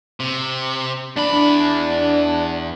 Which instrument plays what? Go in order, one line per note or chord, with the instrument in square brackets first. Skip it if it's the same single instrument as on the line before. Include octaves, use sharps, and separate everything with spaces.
[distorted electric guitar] C3
[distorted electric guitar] E2 B5 [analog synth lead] D4